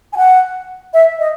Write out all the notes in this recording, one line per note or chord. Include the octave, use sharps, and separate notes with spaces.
G#5
F#5
E5
D#5